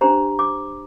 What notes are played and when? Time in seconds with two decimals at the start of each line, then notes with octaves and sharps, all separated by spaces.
0.01 D4 G4 C5 A#5
0.39 D6